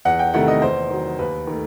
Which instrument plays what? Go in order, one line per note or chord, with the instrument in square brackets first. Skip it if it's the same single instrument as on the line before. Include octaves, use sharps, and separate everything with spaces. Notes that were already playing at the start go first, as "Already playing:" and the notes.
[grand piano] E2 F#5
G5
C3 D#3 A3 E4 F#5
D#5
E2 C5
D#3 F#3
D#2 B4
D#3 A3